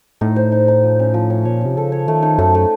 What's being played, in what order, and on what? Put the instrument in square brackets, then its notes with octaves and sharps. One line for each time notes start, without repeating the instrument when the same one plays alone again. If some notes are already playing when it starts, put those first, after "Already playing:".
[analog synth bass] A2 [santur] D#4
[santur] C5
D#4
D#4
F3
C#4
F3
C#4
[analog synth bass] A#2 [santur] C#5
[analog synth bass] C3 [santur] C#4
[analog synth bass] C#3 [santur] A4
[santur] C#5
[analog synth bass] D#3 [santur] A3
[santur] D#4
[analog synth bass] F#2 [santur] A3
[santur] A3